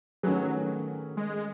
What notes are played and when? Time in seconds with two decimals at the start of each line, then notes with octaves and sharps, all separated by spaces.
0.23 D#3 F#3 A3 C#4 G#4 B4
1.17 G#3